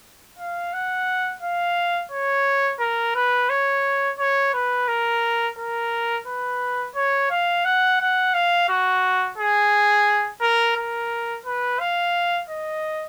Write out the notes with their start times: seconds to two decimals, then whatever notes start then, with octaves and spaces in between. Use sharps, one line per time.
0.39 F5
0.73 F#5
1.42 F5
2.12 C#5
2.80 A#4
3.16 B4
3.50 C#5
4.19 C#5
4.54 B4
4.88 A#4
5.58 A#4
6.27 B4
6.95 C#5
7.30 F5
7.65 F#5
8.00 F#5
8.34 F5
8.69 F#4
9.38 G#4
10.42 A#4
10.77 A#4
11.46 B4
11.80 F5
12.50 D#5